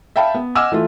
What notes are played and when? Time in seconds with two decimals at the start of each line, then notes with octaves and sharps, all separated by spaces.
0.16 E5 F5 G5 A5 B5
0.34 B3
0.55 D#5 F#5 G#5 D6 E6 F6
0.72 E3 A3 F4